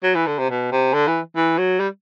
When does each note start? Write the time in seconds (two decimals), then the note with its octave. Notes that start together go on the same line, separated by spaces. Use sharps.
0.04 F#3
0.15 E3
0.27 D3
0.39 C3
0.50 B2
0.72 C3
0.93 D3
1.07 E3
1.36 E3
1.58 F#3
1.80 G3